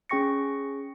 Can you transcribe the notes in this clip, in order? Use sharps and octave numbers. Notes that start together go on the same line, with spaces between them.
C#4 G#4 G5 C#6 A#6 C#7